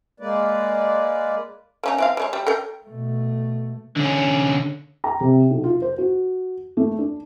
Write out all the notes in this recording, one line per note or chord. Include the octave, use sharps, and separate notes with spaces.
G#3 A#3 B4 D5
A#3 C#4 D#4
E3 C4 F5
G#3 B4 C#5
G3
A4 A#4 G5
B2 A3
D3 C#4
A#5
C3
B1
F4
C5
F#4
A3
D4